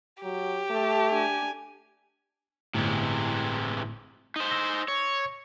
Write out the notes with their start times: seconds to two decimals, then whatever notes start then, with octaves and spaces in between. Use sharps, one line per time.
0.23 F#3 G4
0.70 A3 A5
1.10 D4 G#5
2.74 G1 A2 C3 E3 G#3
4.36 D#4 C5
4.51 E6 A#6
4.88 C#5